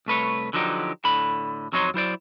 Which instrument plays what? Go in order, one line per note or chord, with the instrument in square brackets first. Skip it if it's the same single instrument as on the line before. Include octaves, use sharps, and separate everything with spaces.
[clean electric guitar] C2 A3 B4 C#5
D3 F3 F#3 D#4 G4
A2 D3 B5
F2 F#3 C#4 D#4 C#5 C6
F#3 E4 C5 D5